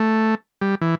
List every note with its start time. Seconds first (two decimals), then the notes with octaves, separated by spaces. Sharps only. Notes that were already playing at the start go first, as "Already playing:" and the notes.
Already playing: A3
0.62 G3
0.82 E3